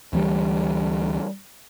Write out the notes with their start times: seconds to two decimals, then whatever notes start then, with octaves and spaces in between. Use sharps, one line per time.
0.13 D2 E3 G3